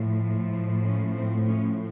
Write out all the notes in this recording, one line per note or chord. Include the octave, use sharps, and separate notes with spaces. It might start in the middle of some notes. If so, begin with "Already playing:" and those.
Already playing: A2 F3
C#4
C4
C#4